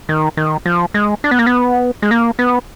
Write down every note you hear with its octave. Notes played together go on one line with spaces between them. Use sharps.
D#3
D#3
F3
G#3
D4
B3
A#3
B3
G#3
A#3
B3